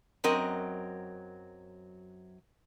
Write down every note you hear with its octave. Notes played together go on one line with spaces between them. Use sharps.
F#2 F#3 C4 A#4 D#5